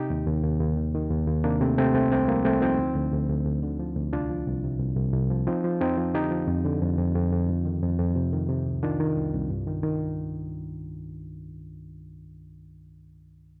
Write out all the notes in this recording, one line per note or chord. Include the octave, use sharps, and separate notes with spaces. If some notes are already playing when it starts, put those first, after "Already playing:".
Already playing: C3 D#4 G4
D#2
D#2
D#2
D#2
D#3
D#3
D#2
D#2
C3 A#3 D4
C3 A3 C4
C3 A3 C4
C2 A3 C4
C2 A3 C4
F3 G3 A#3
C2 A3 C4
F3 C4 D#4
D2
D2
D2
D2
D2
D3
F3
D2
C2 D4 F4
F3
C2
C3
C2
C2
C2
F3
F3 C4 D#4
F3
F2 C4 D#4
F3
D3 D#4 G4
F3
F2
D3
F2
F2
F2
F2
F2
D#3
F2
F2
C3
D#3
C3
C2
D#3 D4 F4
D#3
C2
C2
G2
D#3
D#3